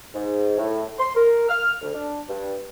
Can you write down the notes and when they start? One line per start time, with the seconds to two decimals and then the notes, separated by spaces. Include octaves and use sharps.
0.14 G#2
0.57 A2
0.99 C6
1.15 A#4
1.49 F6
1.82 D2
1.94 D4
2.28 G2